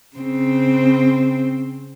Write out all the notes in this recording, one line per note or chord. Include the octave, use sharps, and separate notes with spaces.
C#3 C4